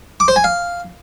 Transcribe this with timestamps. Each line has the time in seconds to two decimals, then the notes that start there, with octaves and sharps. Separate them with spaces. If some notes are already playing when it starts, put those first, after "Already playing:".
0.20 D6
0.28 C5
0.36 G#5
0.44 F5